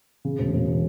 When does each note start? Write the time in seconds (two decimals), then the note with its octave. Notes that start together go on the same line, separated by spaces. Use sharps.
0.25 C#3
0.39 E1
0.53 E1